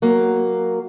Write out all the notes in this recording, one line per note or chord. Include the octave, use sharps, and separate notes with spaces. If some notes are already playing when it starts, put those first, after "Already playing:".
F#3 A#3